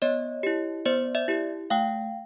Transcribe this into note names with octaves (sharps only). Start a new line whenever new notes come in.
B3 C#5 D#5
E4 G4
B3 C5 D5
D5 E5
E4 G4
A3 F5 G5